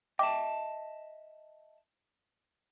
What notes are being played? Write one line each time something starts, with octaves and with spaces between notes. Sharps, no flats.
D#5 E5 G5 A5 D6